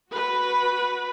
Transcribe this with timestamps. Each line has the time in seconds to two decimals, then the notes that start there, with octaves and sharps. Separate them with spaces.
0.12 F#4 B4